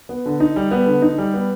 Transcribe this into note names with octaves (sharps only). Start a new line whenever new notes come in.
B3
D3
D#4
G3
B3
D3
D#4
G3
B3